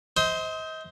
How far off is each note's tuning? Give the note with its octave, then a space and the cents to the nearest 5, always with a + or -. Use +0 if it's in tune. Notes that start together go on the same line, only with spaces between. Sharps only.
C5 -10 D#5 +35